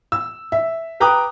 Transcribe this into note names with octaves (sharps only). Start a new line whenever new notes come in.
E6
E5
B4 G5 A#5 D6 D#6 F#6